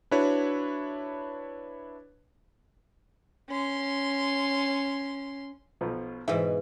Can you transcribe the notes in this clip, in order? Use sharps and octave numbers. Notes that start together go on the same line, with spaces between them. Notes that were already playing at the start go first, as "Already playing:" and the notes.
D4 E4 F#4 B4 C#5
C#4 C6
B1 B2 F3
G#2 B2 E3 E4